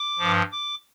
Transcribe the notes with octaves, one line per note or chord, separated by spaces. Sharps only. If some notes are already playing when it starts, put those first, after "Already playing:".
Already playing: D6
G2 F3
D6